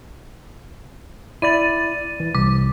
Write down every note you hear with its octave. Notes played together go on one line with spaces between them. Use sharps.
E4 D5 A6 D#7
E3
C2 D6